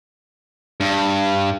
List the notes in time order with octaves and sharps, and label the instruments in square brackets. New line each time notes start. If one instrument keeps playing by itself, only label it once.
[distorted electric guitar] G2